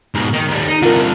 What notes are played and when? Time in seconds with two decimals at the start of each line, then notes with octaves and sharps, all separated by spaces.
0.14 G#2 B2
0.33 D#3 D#4
0.48 D#2 G3
0.68 D#4
0.82 C2 D3 F4 A#4